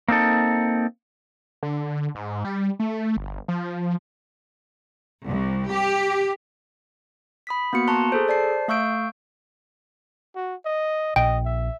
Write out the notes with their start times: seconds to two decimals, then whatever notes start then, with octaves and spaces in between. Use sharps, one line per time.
0.08 A#3 C4 D#4 A4
1.63 D3
2.15 G#2
2.45 G3
2.79 A3
3.17 G1
3.48 F3
5.24 C2
5.70 G4
7.47 B5 D#6 B6
7.73 A#3 B3 F#4 C#7
7.87 A5 A#5 C6 C#6 F#6
8.12 G#4 A4 C5
8.27 C5 D5 A5 C7
8.68 A3 F5 C#6 E6 G6 D7
10.36 F#4
10.65 D#5
11.16 A#1 D#5 G5
11.45 E5